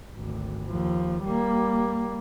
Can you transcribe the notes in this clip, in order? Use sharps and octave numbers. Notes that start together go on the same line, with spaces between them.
G#1 D2
D#2 F3
G3 A#3